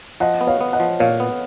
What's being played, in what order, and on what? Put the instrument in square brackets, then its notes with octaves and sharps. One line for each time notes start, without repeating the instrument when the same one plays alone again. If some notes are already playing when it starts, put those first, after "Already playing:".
[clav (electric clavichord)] F3 [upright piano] D#5 F#5
[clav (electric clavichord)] B3
[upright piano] C#5 F5
[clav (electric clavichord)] B3
[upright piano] D#5 F#5
[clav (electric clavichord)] F3
[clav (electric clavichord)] A#2 [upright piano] C#5 F5
[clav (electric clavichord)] B3